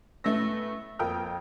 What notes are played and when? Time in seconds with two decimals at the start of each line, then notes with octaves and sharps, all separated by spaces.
0.24 A2 A3 B3 C#4 E6 A#6
0.99 F2 A#3 A4 G5 D#6 F6